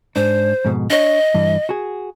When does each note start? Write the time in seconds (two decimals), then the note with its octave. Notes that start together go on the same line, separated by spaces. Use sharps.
0.16 G#2 D4 C5
0.65 F2 G#2 B2
0.90 D4 C#5 D#5
1.34 G2 E3
1.69 F#4 G#4